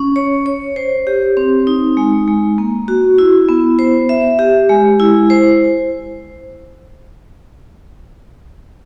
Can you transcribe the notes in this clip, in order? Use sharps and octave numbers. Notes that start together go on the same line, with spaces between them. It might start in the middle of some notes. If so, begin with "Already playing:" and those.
Already playing: C#4
C#5
C#5
C5
G4
C4
D#4
G#3
G#3
A#3
F#4
E4
B3
C5
E5
G4
G#3
E4
C5